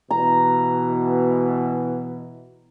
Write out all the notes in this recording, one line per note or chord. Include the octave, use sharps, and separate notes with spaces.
B2 E3 A#5